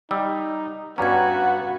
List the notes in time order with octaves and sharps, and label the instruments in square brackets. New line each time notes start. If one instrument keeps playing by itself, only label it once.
[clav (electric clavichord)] G3 [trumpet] D#4 [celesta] E6
[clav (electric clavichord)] G2 G3 C#4 [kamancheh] B3 F#4 [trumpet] F#5 [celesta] A#5 G#6